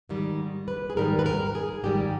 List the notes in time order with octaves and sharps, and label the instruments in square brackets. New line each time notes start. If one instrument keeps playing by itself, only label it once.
[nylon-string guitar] G#2 D#3 G3
B4
G#4
G#2 D#3 G3 A#4
B4
A#4
G#4
G#2 D#3 G3 G4